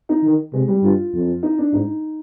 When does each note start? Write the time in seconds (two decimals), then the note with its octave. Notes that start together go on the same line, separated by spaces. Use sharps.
0.09 D#4
0.24 D#3
0.53 C3 G#3
0.68 G3
0.83 G2 F4
1.14 F2
1.43 D#4
1.58 D4
1.73 G#2 D#4